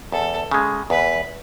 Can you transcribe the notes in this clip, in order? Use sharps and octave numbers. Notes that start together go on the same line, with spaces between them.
E2 A4
C#3 G#3
E2 B4